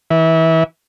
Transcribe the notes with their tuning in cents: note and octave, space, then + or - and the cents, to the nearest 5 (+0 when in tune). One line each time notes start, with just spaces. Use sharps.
E3 -25